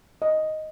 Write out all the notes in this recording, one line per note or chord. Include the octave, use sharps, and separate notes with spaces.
D#5